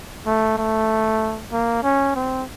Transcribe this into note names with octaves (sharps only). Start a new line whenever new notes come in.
A3
A3
A#3
C#4
C4